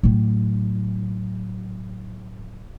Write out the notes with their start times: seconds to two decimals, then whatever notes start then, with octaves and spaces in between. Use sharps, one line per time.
0.03 A2 F#3